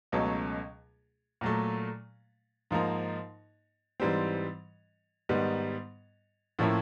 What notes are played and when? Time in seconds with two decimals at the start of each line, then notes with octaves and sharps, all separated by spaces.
0.12 C#2 B2 F#3 A3 C#4
1.41 A#2 F#3 A3
2.71 G#2 F3 A#3 D#4
4.00 G#2 E3 G3 C4
5.29 G#2 D#3 G3 B3
6.59 A2 F3 A#3 C#4 E4